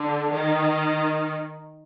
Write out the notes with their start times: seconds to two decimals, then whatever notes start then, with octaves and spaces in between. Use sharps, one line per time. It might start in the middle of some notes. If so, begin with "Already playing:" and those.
Already playing: D3
0.31 D#3